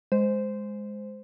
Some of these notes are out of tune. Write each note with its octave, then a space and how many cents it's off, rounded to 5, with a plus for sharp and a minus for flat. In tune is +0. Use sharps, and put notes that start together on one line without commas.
G#3 +0 C5 -10